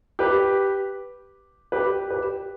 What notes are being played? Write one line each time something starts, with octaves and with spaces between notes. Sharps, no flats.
G4 B4
G4 B4
G4 B4